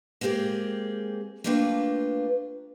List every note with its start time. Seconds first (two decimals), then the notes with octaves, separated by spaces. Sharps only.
0.21 G#3 A#3 C4 G4 G#4
1.44 A3 A#3 D4 F4 B4 G5